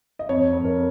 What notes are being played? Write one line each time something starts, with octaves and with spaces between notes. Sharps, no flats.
D#5
F2 C#5
F2
A#4